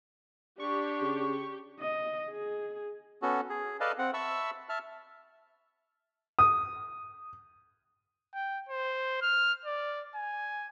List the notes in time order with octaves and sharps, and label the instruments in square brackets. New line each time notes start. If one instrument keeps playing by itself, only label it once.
[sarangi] D4 [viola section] G4 [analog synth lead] C#6
[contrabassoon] C#3
[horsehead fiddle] D#5
G#4
[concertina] B3 C#4 F#4 A4
G#4
A4 B4 D5 D#5 F5 A5
C4 F#5
E5 A5 B5 C#6 E6
E5 A5 F6
[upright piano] D#6
[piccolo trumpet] G5
C5
F6
D5
G#5